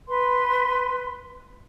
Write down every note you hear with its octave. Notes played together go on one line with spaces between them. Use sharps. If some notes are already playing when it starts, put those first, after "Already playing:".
B4 C6